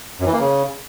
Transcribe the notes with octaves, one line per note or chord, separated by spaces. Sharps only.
F#2
E3
A#3
C#3